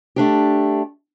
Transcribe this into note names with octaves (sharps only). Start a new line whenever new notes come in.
A3 D4 G4